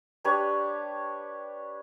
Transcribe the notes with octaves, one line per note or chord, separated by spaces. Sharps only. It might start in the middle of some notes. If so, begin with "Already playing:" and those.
D4 G4 B4 C#5